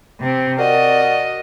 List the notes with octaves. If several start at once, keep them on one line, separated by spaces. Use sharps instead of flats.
C3 C4
F#4 A#4 D5 D#5